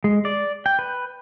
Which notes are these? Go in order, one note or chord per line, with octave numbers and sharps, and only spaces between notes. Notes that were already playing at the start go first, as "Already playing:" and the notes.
G#3
D5
G5
B4